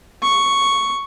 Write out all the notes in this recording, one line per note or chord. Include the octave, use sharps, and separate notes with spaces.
C#6